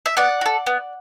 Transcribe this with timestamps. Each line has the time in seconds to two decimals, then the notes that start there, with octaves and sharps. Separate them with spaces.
0.06 E5
0.17 B3 D5 F#5
0.41 F#4
0.46 A4
0.66 B3